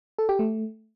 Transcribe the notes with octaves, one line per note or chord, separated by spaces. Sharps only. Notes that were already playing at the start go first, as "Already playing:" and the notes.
A4
G4
A3